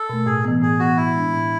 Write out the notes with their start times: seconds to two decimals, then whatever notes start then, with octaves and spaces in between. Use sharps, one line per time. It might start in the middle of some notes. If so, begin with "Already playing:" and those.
Already playing: A4
0.09 B2 A3
0.26 A2 G#4
0.45 E3 B3
0.62 A2 G#4
0.79 E3 B3 F#4
0.97 A2 E4
1.15 G#3 D4
1.33 A2